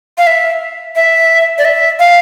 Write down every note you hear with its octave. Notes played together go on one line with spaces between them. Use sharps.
F5
E5
E5
D5
E5
F5